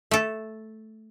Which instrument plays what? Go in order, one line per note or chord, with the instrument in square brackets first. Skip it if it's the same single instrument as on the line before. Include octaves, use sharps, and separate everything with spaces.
[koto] A3 A4